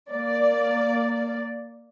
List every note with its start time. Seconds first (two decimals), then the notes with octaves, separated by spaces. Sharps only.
0.11 A#3 D5